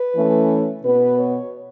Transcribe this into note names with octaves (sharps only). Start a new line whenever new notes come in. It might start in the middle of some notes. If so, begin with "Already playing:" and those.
Already playing: B4
E3 A3 C#4
B2 B3 B4
C#5